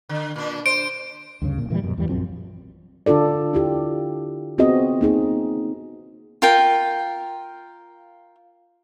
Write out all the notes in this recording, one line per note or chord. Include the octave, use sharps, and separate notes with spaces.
D3
A#2 D4
C5 D7
D2 G2 C#3
D1 A#2
A#2 E3 F#3 G3
F#2 B2
E2 G2 E3 G3
A#1 F#2 F3 C4
D3 D4 F4 A4 D5
E4 F4 G4
B3 C4 F4 F#4 G#4 D#5
A#3 D#4 G#4
F4 A#4 G5